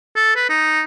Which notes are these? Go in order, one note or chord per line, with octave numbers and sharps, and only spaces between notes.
A4
B4
D#4